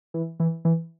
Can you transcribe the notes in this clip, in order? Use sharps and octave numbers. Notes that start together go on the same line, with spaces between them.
E3
E3
E3